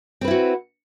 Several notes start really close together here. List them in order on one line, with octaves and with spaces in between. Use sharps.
C4 B4 E4 F#4